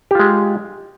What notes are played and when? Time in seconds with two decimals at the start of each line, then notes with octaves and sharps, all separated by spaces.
0.11 G4
0.15 F4
0.19 G#3